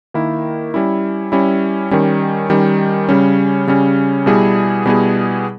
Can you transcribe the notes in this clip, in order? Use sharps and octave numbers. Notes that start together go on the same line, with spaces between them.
D#3 A#3 E4
G3 C#4 E4
G3 C#4 E4
D#3 G3 C#4
D#3 G3 C#4
C#3 G3 C#4
C#3 G3 C#4
B2 G3 B3 E4 G#4
B2 G3 B3 E4 G#4